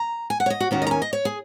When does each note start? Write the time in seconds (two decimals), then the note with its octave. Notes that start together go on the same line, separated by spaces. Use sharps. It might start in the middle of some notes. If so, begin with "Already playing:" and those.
Already playing: A#5
0.30 G#5
0.40 F#5
0.46 C#5
0.50 D#5
0.60 F#4
0.71 D#2 D#3 A#3 C#4 F#4
0.82 D#5
0.87 A#5
0.91 G#5
1.02 D#5
1.13 C#5
1.25 G#4